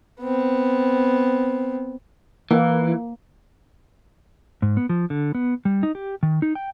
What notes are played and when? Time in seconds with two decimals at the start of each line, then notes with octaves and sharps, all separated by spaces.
0.20 B3 C4
2.51 E3 A#3
4.62 G#2
4.77 B3
4.89 F3
5.10 D3
5.35 B3
5.65 G3
5.83 D#4
5.95 G4
6.23 D#3
6.42 D#4
6.55 G5